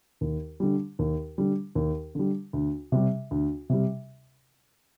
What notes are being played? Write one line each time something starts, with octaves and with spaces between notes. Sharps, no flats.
D#2
D3 G3
D#2
D3 G3
D#2
D3 G3
D2
C3 G3
D2
C3 G3